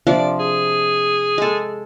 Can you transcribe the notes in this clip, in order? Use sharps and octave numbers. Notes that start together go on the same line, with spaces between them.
C3 F3 D4 D5
G#4
G#3 A4